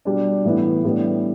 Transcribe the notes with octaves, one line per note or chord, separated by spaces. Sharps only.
B2 G3 D4
A2 E3 B3 E4
A2 G3 B3 D4